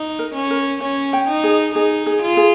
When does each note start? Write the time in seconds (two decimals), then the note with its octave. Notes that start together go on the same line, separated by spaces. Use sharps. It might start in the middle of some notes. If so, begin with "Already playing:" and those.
Already playing: D#4
0.19 A#4
0.34 C#4
0.50 A#4
0.81 C#4 C#5
1.13 G5
1.28 D#4
1.44 G#4
1.75 D#4 G#4
2.06 G#4
2.22 F4
2.37 G#4